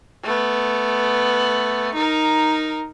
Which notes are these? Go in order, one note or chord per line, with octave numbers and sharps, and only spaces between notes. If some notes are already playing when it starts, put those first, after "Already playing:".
A3 B3
D#4 A#4